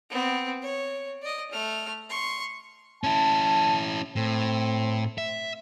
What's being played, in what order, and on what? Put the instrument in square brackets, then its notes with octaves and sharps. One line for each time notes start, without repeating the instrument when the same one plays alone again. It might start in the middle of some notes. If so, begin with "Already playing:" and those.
[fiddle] B3 C4
C#5
D5 D#5
A3 F6
C6 C#6
[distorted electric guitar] C#4 E4 [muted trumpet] A5
[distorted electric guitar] A2 [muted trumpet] C4
[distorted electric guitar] E5